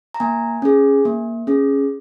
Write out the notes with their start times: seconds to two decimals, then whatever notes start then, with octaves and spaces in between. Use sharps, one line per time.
0.14 A#5
0.20 A#3 G#5
0.62 C#4 G#4
1.05 A#3
1.47 C#4 G#4